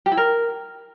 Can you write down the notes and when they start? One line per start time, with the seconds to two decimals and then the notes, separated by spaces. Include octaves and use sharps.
0.06 G4
0.12 E4
0.17 A#4